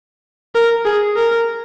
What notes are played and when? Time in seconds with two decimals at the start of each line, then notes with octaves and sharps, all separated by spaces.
0.55 A#4
0.86 G#4
1.16 A#4